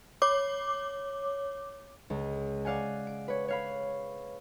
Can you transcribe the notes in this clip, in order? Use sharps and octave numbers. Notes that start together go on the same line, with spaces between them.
C#5 D6
C#2
D5 F5 F#5 G#5
D7
B4 C#5
C#5 F5 B5